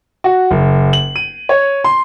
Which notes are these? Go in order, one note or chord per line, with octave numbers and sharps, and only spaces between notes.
F#4
F#1
F#7
D#7
C#5
C6